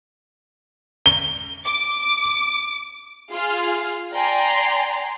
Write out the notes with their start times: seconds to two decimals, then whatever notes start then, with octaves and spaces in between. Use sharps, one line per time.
1.06 G7
1.65 D6
3.32 F4 G#4 F5
4.13 D5 G5 G#5 A#5 C6